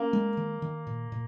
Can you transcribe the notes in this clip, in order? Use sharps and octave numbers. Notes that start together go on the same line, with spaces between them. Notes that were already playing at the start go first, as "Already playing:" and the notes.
Already playing: A#3 C#4
G#3
D#3
D#3
A#2
A#2